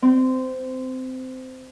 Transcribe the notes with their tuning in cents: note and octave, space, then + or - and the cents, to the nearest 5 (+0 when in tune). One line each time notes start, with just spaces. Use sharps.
C4 -20